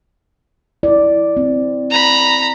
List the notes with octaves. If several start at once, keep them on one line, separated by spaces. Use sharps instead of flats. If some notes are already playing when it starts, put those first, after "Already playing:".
E4 D5
C4
A#5 B5